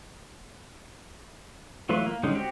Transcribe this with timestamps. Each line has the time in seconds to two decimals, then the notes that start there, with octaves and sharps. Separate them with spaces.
1.89 E3 F#3 A3 F4 B4
2.06 A#3
2.23 D3 G3 G#3 C#4 D#4
2.35 C4 F#4 G4